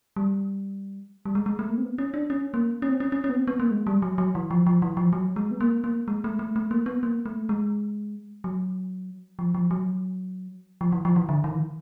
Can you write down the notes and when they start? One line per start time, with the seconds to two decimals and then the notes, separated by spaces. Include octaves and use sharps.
0.16 G3
1.25 G3
1.35 G#3
1.46 G#3
1.59 A3
1.70 A#3
1.78 C4
1.82 B3
1.98 C#4
2.14 D4
2.30 C#4
2.54 A#3
2.82 C#4
2.89 C4
3.00 C#4
3.12 C#4
3.24 C#4
3.30 B3
3.36 C4
3.48 B3
3.60 A#3
3.71 G#3
3.87 G3
4.02 F#3
4.18 F#3
4.35 E3
4.51 F3
4.67 F3
4.82 E3
4.97 F3
5.13 F#3
5.36 G#3
5.51 B3
5.61 A#3
5.84 A#3
6.08 G#3
6.24 A3
6.39 A3
6.56 A3
6.71 A#3
6.86 B3
7.03 A#3
7.26 A3
7.49 G#3
8.44 F#3
9.39 F3
9.55 F3
9.71 F#3
10.81 F3
10.93 E3
11.05 F3
11.16 E3
11.29 D3
11.44 D#3
11.55 E3
11.59 D#3